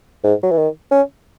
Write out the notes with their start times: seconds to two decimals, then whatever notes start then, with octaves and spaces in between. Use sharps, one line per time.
0.24 G#2
0.43 F#3
0.51 E3
0.58 D#3
0.91 C#4